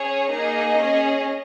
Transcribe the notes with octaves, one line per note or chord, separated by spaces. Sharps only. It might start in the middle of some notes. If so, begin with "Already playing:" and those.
Already playing: C#4 G#4 C#5
A#3 D#4 G#4 D#5
C#4 G#4